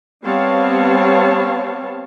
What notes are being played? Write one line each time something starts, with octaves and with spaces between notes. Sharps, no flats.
G3 B3 C4 C#5 F5 A5